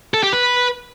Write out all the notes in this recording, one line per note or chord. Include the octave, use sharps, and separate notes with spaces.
A4
G4
B4